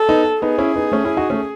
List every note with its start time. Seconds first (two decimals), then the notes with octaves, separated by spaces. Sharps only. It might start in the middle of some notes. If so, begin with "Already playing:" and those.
Already playing: A4
0.09 B3 D#4
0.42 B3 D#4 G#4
0.58 C#4 E4
0.76 B3 D#4
0.92 A3 C#4
1.04 C#4 E4
1.17 D#4 F#4
1.30 A3 C#4